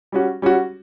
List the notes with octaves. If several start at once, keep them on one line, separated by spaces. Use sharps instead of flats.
G3 C#4 F#4
G3 C#4 F#4